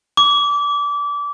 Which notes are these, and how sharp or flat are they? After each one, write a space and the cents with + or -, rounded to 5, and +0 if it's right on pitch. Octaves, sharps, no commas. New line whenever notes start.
D6 -25